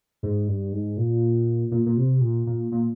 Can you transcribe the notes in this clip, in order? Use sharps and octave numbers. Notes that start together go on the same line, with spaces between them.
G#2
G2
G#2
A#2
A#2
A#2
C3
A#2
A#2
A#2